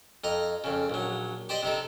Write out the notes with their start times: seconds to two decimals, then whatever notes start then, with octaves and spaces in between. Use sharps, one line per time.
0.24 F2 D#5 A#5
0.64 F2 C#3
0.90 A#1 F#3
1.49 G4 C5 D5 D#5
1.63 C3 D#4 A4